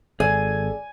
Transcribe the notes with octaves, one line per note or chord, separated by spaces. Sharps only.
G#1 G#4 A4 D5 G#5